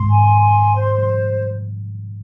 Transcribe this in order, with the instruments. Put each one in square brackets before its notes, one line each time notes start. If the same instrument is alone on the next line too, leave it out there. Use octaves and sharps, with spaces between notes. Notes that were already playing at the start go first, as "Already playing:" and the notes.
Already playing: [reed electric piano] G#2 [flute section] C6
[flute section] G#5
C6
C5